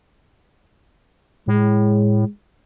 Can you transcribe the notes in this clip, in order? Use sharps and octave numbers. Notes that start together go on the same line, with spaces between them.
A2 G#3